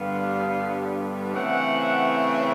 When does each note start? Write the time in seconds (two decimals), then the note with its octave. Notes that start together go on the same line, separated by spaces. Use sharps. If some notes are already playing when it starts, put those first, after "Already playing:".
Already playing: G2 D3 G3 B3 F5
1.33 C#3 E3 A3 C4 F#5